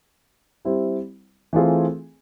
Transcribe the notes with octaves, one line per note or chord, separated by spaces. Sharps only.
G3 C4 E4 G4 C5
E3 A3 C4 F4 G#4